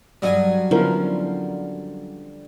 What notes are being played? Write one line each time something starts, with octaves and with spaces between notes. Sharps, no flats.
G2 F#3 G3 D#5 G#5
D3 F3 B3 C#4 E4 A#4